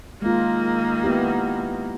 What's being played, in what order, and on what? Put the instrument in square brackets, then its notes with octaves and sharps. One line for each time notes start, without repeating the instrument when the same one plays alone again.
[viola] D#3 A#3 [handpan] G#3 F4
[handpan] B3 E4 G4